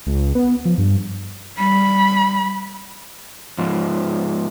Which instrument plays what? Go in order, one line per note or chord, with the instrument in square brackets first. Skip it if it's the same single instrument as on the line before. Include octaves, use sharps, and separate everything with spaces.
[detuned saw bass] C#2
B3
F3
G2
[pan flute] G3 [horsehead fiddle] B5
[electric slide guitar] G#2 F3